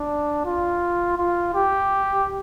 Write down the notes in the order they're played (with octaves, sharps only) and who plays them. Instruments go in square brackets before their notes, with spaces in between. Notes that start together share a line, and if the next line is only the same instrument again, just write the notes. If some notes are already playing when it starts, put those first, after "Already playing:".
Already playing: [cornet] D4
F4
F4
G4